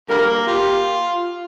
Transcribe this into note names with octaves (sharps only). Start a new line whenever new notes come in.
D3 G3 A#3 A#4
F4 G4